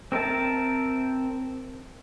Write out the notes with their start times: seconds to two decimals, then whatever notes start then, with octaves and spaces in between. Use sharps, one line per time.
0.12 C4 A#4 E5 A5